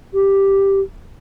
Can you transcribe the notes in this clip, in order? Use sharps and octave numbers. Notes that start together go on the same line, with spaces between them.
G4